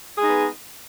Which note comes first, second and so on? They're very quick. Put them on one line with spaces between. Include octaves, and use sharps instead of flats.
G#4 G#3 D#4 B3